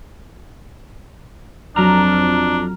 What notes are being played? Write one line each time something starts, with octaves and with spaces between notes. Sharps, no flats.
F2 F#3 D4 A#5 F6